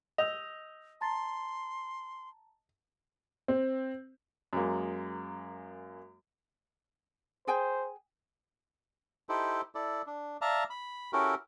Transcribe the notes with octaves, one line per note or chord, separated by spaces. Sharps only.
D#5 E6 G6 F7
A5 A#5 C6 A6
C4
F#2 G#3 A#3
G#4 C5 G5 G#5
D#4 E4 G4 A4 C5
E4 A4 D5
D4
D5 E5 F5 A5 A#5
B5
C#4 E4 F#4 G4 A4 A#4